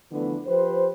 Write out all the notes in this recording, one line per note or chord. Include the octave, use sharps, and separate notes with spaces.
D3 E3 F3 A3 B3 D4
F3 G4 B4 C5